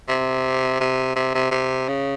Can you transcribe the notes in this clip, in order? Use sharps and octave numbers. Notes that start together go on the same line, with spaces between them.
C3
C3
C3
C3
C3
C#3